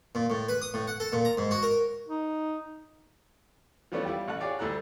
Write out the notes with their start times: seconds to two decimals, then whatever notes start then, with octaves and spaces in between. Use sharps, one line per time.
0.15 A#2
0.30 A2
0.48 B4
0.62 D#6
0.74 A2
0.87 F#5
1.00 A4
1.13 A#2
1.25 A#5
1.37 G#2
1.51 F#4
1.63 A#4
2.09 D#4
3.92 E3 F3 G3 A3 B3 C#4
4.05 G3 E4 F4 G4
4.28 A1 F#5 A5 F#6
4.41 F4 G4 G#4 C#5 D5
4.59 D2 G3 E4 A4 A#5 F#6